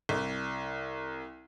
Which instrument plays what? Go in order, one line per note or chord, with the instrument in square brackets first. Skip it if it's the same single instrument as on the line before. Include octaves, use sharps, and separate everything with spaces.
[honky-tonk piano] C2